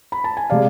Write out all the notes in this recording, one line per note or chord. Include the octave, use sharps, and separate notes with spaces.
B5
A5
G#5
C3 G#3 D5 F5